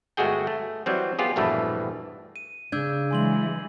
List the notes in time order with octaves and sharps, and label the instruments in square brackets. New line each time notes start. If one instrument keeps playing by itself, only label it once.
[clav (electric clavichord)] G1 G#3 A3 F#4 G#4 G5
A3
E3 F#3 G3 C4
B3 F4 G4 G#4
A#1 E2 G2 B2 E3 A3
[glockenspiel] D#7
[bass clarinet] C#3 [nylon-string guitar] D4 [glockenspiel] E6 G6 G#6
[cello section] E3 F#3 G#3 [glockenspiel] G#5 C6 F#7